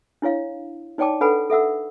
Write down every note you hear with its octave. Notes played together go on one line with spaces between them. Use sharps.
D4 E4 C#5 F5
D#4 C#5 D5 G5 A5 D6
D4 A4 B4 F#5 G#5 B5
A4 E5 F#5 E6